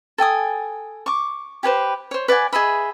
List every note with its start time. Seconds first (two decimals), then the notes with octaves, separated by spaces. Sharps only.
0.18 A4 G5 G#5 D#6
1.06 C#6 D6
1.63 G4 G#4 B4 C5
2.11 C5 C#5
2.28 B4 D5 F#5 G#5
2.53 G#4 D#5 E5 B5